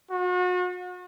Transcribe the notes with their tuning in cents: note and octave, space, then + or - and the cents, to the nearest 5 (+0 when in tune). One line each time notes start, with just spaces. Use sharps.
F#4 -40